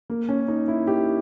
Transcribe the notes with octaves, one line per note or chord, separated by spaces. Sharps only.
A#3
C#4
D#4
E4
G4